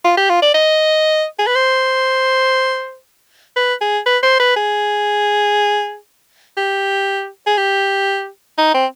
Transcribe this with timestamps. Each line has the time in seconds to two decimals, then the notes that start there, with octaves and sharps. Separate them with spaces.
0.04 F4
0.17 G4
0.29 F4
0.42 D5
0.54 D#5
1.39 G#4
1.47 B4
1.56 C5
3.56 B4
3.81 G#4
4.06 B4
4.23 C5
4.40 B4
4.56 G#4
6.57 G4
7.47 G#4
7.58 G4
8.58 D#4
8.74 C4